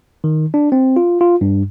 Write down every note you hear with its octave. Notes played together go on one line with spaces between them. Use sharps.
D#3
D4
C4
F4
F4
G2